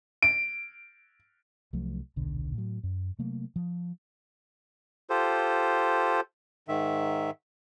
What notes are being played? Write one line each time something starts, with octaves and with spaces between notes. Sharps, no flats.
D7
C2 F3 F#3 A3
D#1 B1 D3
A2 F#3
F#2
C3 F#3 A3 A#3
F3
F4 G4 A4 C5
G#2 D#3 E5